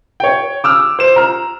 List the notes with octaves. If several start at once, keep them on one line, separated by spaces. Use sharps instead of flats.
C#5 G5
D6 E6 F6
C5 E7
A#5 F6